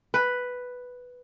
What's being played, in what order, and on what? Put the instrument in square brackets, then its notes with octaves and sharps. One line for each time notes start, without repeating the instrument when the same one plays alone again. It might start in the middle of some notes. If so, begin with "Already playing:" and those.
[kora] B4